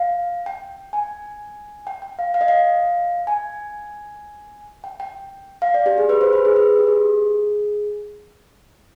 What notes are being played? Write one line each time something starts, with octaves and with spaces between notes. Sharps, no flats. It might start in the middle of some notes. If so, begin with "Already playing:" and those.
Already playing: F5
G5
G#5
G5
G5
F5
F5
D#5
F5
G#5
G5
G5
F5
D5
G4
G#4
B4
C5
B4
G#4
B4
G4
G#4